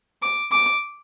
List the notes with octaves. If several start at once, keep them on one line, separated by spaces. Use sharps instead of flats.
D6
D6